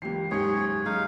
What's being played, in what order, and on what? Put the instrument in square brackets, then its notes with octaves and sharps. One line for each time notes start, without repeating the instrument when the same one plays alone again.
[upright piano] C#2 G4 C7 [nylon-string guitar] E3 A#3
[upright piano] F#1 G#2 C#7 [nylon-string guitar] D#2 G4 [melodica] G#4 C#5
[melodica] D#4 F5 [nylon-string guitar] G#4